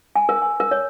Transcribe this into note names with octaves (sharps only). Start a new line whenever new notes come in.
G#5
A#4
G#5
A#4
C#5